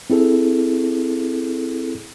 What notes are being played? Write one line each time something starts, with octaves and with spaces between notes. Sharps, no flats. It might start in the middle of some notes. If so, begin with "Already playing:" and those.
C4 E4 G#4 A4